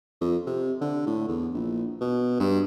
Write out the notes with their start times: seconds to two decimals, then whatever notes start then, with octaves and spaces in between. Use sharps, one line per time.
0.21 F2
0.46 C3
0.81 D3
1.07 A2
1.28 E2
1.54 A#1
2.01 B2
2.40 G2